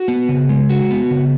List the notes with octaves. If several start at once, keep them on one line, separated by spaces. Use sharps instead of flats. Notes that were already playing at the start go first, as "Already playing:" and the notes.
Already playing: F#4
B3
C#3
G#3
F#4
B3
C#3